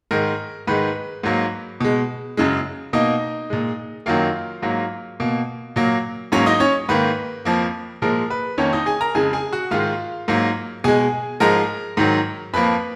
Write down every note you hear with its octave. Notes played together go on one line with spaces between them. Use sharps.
G#2 D#3 G#3 A#4
G#2 D#3 G#3 B4
G#2 F#3 A#3
B2 G#3
F#2 C#3 G#3
B2 A#3 D#4 D#5
A#2 G#3
F#2 D#3 F#3 A#3 F4 F5
G#2 F#3 A#3
B2 A#3
A#2 F#3 A#3
G#2 F#3 A#3 C#4 C#5
D#4 D#5
C#4 C#5
G#2 D#3 A#3 B4
F2 F3 A#3
A#2 F3 G#3 A#4
B4
F2 D#3 A#3 C#4 C#5
D#4 D#5
G#4 G#5
A#4 A#5
F2 C#3 G#3 G#4 G#5
G#4 G#5
F#4 F#5
G#2 D#3 G#3 F4 F5
G#2 F#3 A#3
B2 G#3 G#4 G#5
G#2 F3 G#3 A#4 A#5
G#2 D#3 F#3
F2 F3 A#3 B4 B5